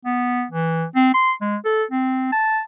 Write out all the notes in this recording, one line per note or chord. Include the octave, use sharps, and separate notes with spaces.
B3
E3
C4
C6
G#3
A4
C4
A5